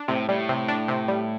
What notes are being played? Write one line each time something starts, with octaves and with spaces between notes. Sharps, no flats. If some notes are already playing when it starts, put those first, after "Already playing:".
Already playing: D4
A2 C3
A2 G3
C3
D4
C3
G3